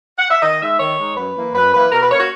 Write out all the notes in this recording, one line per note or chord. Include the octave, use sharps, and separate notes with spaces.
F#5
E5
D#3 D#5
G#3 D#4 E5
D#3 C#5
G#3 D#4
F#2 B4
E3 A#3 E4
F#2 B4
E3 A#3 E4 B4
B2 A#4
B4
A#3 C#4 C#5
F#4